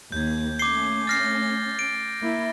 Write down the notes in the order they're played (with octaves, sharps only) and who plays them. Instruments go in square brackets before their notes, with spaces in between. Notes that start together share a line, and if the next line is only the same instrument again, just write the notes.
[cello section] D#2 [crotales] G6 G#6
[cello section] A3 C#4 [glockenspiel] D6 C7 [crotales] G7
[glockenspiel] D6 F6 C7 [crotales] A6 A#6
[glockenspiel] D7
[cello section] A#3 E4